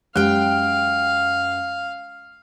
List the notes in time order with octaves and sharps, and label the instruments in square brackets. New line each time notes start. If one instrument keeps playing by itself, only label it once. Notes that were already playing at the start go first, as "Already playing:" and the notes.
[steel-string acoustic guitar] F#2 G5 [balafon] G#3 G4 [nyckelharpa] F5